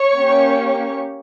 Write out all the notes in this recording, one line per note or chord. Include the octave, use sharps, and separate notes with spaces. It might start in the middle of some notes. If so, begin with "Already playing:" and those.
Already playing: C#5 C#6
A#3 C#4 G4